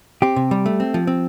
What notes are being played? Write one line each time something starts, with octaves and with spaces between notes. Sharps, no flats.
C4 G4
C3
G3
A3
C4
F3
C4